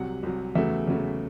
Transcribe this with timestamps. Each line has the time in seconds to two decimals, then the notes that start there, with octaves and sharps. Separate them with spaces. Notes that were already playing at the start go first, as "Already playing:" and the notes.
Already playing: C2 C3 F#3 F#5
0.23 C2 C3 F#3
0.55 E2 C#3 F#3 A3 E5
0.87 E2 C#3 F#3 A3